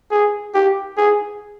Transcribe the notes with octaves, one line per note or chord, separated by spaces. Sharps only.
G#4
G4
G#4